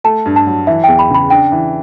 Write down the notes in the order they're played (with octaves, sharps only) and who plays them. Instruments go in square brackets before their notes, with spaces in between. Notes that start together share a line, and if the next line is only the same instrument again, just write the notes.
[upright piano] A3 [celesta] A5
[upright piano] G2
[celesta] A5
[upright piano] F#3
[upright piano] E3 [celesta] E5
[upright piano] E2 [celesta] G5
[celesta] B5
[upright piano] C#3 [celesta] B5
[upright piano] D4 [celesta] G5
[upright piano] E3